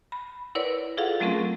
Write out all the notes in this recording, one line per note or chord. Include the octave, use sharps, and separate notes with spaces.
B5
E4 A#4 B4 C#5 D5
F4 G#4 A4 F5 F#5
F#3 A3 C4 C#4 G#4 A#4